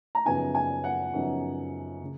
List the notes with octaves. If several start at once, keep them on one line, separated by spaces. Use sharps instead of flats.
A#5
F#2 C#3 F3 B3 D#4 G#5
G#5
F#5
F#2 C#3 F3 B3 D#4
C#3